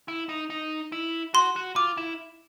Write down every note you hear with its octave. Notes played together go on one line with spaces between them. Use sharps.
E4
D#4
D#4
E4
F#4 C6
F#4
F4 D6
E4